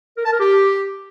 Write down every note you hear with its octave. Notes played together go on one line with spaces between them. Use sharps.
A#4
A5
A#4
G4